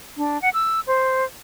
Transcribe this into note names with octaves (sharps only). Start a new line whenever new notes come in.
D4
F#5
E6
C5